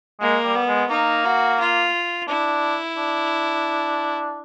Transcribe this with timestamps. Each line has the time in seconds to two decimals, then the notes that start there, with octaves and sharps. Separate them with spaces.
0.20 G#3 A#3
0.44 G3
0.55 B3
0.68 G#3
0.90 A#3 D#4
1.25 F#4
1.60 F4
2.28 D4 E4
2.97 D4